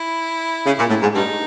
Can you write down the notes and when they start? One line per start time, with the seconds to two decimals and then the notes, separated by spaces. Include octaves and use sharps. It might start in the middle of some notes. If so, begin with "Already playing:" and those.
Already playing: E4
0.66 C#3
0.78 A#2
0.89 A2
1.02 G#2
1.15 G2 D#4